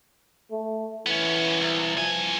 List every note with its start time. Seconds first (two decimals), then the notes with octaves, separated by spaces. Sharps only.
0.51 A3
1.06 E3 B3 C#4
1.61 C2
1.97 G2 F3 G#5